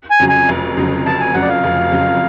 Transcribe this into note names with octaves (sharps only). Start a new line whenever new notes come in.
G#5
F2 C#3 F#3
G#5
F1
F2 C#3 F#3
F1 A5
G#5
F2 C#3 F#3 F#5
D5
F5
F1
F2 C#3 F#3